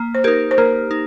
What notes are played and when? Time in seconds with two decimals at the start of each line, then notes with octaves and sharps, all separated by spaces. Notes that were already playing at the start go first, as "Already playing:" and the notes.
Already playing: A#3
0.15 C5
0.24 D#4 G4 A#4
0.51 C5
0.58 A#3 A#4
0.91 D#4